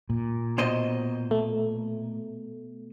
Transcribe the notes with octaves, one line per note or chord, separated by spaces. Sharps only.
A#2
B2 C5 D#5
A3